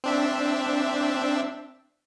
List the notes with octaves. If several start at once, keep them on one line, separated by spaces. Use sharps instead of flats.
C4 D4 E5